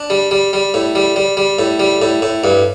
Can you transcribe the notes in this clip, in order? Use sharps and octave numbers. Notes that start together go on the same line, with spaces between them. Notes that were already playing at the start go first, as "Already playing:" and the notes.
Already playing: D4
G3
G3
G3
A2
G3
G3
G3
A2
G3
A2
A2
G2